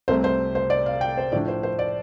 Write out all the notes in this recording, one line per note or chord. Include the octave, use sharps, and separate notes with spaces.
C2 C3 A3 C5
C5
C5
D5
F5
G5
C5
A2 F3 D4 D5
C5
C5
D5